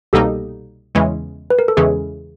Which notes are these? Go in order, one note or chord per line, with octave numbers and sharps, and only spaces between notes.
C2 B2 G3 A#3 D#4 G4 A4
E2 C#3 E3 G#3 C#4
B4
A#4
A4
E2 C#3 E3 G#3 C#4 G#4